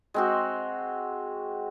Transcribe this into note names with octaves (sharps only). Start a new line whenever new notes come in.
G#3 C4 F#4